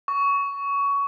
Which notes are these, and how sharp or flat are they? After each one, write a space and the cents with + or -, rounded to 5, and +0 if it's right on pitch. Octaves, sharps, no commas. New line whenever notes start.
C#6 +20